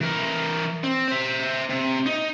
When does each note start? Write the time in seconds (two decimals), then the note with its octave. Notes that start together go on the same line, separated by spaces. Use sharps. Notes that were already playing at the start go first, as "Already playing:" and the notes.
0.01 E3 A#4
0.84 C4
1.08 C5 E5
1.70 C3
2.06 D#4